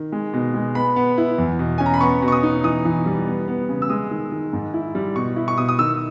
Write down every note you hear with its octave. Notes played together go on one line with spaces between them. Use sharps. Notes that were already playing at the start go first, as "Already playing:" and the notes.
Already playing: D#3
G#3
B2
G#3
B3 B5
B3
E4
E2
B2
C#4 G#5
A#5
B5
B3 C#6
B2
C#6
D#6
D#4
E3 D#6
E3
G3
B3
B3
C#3
E6
G#3 D#6
D#3
D#3
G#2
E4
G3
B2 C#6
E4
C#6
B2 D#6
D#6
D#3 E6